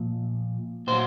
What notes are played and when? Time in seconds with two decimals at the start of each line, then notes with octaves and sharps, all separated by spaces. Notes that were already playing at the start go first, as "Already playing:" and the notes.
Already playing: A#2 F3
0.87 A#2 F#3 C5